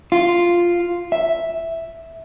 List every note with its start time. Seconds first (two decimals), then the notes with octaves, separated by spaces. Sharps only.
0.12 F4
1.12 E5